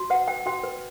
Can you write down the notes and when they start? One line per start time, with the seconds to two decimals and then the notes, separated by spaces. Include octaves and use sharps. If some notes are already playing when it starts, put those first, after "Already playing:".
Already playing: F#4
0.10 B4 F#5
0.28 B4 G5
0.46 F#4 G5
0.64 B4